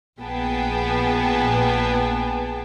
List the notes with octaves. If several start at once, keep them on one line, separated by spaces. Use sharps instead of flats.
A#1 B3 G#4 B4 G5 A5